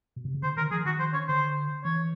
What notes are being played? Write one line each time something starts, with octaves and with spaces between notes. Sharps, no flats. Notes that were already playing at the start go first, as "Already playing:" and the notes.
B2
C3
C#3
D3 C5
D#3 A#4
F3 G#4
D#3 F#4
C5
C#5
D3 C5
E3 C#5